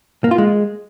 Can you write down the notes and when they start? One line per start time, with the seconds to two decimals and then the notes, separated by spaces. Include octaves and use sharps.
0.24 A#3
0.31 F4
0.38 G#3